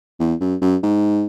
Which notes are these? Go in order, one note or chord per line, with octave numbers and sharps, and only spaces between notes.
E2
F#2
F#2
G#2